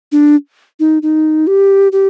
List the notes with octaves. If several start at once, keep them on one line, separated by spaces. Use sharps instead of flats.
D4
D#4
D#4
G4
G4